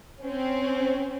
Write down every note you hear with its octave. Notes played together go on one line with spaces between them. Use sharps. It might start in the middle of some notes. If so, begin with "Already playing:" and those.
C4 C#4